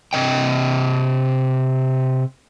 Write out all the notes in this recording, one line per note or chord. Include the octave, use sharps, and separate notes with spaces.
C3 D#5 G5